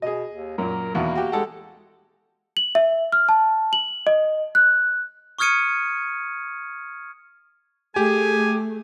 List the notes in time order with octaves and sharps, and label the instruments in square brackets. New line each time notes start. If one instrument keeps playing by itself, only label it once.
[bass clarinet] B2 [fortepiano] G#4 D#5
[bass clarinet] D#2
[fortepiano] F#2 A#2 [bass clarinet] A#4
[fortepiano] E2 B2 D#3 [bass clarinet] A#3
[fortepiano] F#4 G4
[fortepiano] G#3 A4 F#5 [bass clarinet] G4
[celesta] F#7
E5
F6
A5
F#7
D#5
F#6
[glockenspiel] C#6 D#6 F6 G#6 C#7 D#7
[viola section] A3 [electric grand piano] G4 [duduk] G#4 [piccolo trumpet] G#5